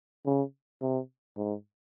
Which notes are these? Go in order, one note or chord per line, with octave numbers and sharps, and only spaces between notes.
C#3
C3
G#2